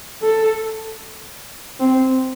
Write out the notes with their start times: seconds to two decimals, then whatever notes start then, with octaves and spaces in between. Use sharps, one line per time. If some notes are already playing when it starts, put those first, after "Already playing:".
0.22 A4
1.80 C4